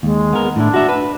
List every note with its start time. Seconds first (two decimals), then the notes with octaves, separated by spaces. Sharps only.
0.03 D#2 G#3
0.33 B3 A#4
0.56 A2 D4 E4
0.74 F#4 E5
0.89 B4